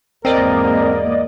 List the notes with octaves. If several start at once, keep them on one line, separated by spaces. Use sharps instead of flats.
E2 G#2 A#3 C4 A#4 D5 D#5